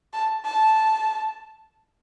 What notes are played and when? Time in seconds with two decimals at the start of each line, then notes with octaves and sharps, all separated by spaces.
0.13 A5
0.45 A5